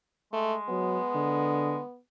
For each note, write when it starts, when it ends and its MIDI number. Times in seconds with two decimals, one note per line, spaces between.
0.33 1.81 56
0.33 0.55 57
0.69 0.98 54
0.69 1.98 59
1.15 1.80 50